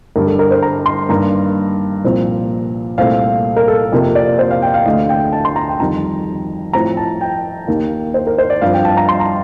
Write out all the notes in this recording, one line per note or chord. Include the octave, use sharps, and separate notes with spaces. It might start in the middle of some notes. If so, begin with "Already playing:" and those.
G2 D3 G3 A#4
A4
A#4
C5
A#5
C6
G2 D#3 A#3 A#5
C2 A#2 F3 C4
C2 A#2 A3 C4 F5
A#4
A4
F2 C3 F3 A#3
D5
C5
F5
G5
F5
D2 D3 A3 D#5
G5
A5
C6
A#5
G5
F2 D#3 G3 A#5
A2 F3 C4 A#5
A5
G5
D#2 D#3 A#3
C5
A#4
C5
D5
G2 F3 C4 F5
G5
A5
A#5
C6
A#5